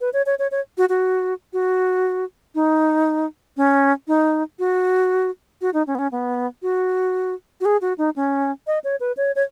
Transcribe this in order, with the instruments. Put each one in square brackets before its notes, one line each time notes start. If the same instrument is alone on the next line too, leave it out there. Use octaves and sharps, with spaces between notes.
[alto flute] B4
C#5
C#5
C#5
C#5
F#4
F#4
F#4
D#4
C#4
D#4
F#4
F#4
D#4
C#4
B3
C#4
B3
F#4
F#4
G#4
F#4
D#4
C#4
D#5
C#5
B4
C#5
C#5